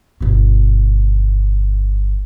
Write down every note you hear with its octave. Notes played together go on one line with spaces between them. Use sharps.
G1 B2